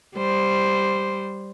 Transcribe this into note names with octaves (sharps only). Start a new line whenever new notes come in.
G3 C5